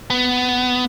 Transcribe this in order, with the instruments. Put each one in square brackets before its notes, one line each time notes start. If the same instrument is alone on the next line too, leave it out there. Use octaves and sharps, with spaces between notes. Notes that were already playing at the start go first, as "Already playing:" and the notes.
[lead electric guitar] B3